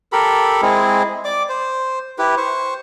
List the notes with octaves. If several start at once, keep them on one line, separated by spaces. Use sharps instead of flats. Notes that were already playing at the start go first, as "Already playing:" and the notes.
G4 A4 A#4 B5
G#3 C4 E4 G#4
D5 D6
C5
E4 G4 B4
C5 C#6